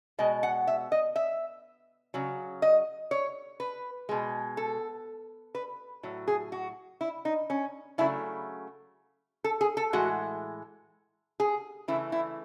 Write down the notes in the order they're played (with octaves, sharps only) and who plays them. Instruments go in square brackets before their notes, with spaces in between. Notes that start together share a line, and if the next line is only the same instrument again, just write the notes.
[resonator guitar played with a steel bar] B2 G#3 D#5
F#5
E5
D#5
E5
C#3 F#3
D#5
C#5
B4
B2 G#3
A4
B4
A2 F#3
G#4
F#4
E4
D#4
C#4
C#3 F#3 A3 E4
A4
G#4
A4
A2 E3 G#3 F#4
G#4
C#3 E3 A3 E4
E4